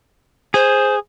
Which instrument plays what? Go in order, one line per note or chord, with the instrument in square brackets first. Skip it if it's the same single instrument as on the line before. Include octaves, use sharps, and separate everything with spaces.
[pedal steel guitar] G#4 [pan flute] C5